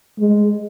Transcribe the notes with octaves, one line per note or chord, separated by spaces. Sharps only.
G#3